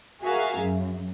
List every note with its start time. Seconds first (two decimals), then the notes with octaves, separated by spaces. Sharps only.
0.21 F#4 G#4 A#4 E5 F5
0.60 F#2